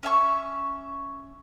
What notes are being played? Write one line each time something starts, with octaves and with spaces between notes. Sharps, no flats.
C#4 E5 G#5 C#6